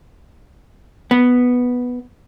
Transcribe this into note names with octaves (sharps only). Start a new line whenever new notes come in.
B3